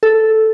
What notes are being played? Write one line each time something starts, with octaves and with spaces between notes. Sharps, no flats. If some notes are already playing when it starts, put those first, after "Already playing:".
A4